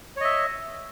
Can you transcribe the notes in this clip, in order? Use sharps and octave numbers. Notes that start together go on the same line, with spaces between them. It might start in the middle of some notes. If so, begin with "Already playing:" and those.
C#5 D#5 E5